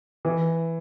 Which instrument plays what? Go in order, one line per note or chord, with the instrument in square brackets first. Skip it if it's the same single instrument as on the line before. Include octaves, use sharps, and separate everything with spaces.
[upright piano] E3